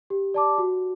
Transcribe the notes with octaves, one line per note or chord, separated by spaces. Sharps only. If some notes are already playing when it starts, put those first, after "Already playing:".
G4
D5 A5 D6
F#4